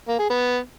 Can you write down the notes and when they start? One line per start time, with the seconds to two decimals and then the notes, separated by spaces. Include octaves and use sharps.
0.08 A#3
0.19 G#4
0.30 B3